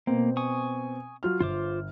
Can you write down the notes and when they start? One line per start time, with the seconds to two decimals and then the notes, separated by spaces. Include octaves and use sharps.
0.07 B2 A#3 C4
0.37 G#5 C#6 D#6
1.23 F#3 F4 F6
1.40 G1 F4 C5 D6